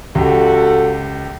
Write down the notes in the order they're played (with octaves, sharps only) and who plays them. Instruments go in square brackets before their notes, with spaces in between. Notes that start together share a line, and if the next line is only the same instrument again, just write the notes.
[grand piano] C#2 G4 [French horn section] F#4 A4